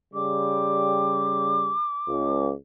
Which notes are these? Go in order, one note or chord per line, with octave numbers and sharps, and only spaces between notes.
C#3 G3 D6
C#2